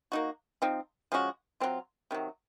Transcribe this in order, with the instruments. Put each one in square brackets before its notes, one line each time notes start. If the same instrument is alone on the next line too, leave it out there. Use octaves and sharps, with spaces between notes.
[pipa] A#3 D#4 F#4
F3 C4 D#4
F3 G#3 C#4 F#4
F#3 C4 F4
C3 D#3 F#3